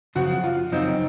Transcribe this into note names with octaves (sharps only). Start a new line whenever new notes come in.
F#2 C#3 F3 C4 F#4
F4
F#2 C#3 F3 C4 D#4